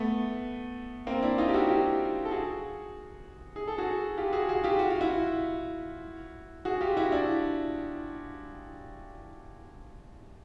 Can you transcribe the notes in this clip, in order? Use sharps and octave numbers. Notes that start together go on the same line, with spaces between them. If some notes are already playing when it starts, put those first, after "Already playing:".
Already playing: A3 B3
A#3 C4
D4 E4
D#4 F4
G4
E4 F#4
F4 G4
A4
F#4 G#4
G#4
A4
F#4 G#4
F4 G4
F#4 G#4
F#4 G#4
F4 G4
F#4
F4
E4 F#4
F#4 G#4
F4 G4
E4 F#4
D4 E4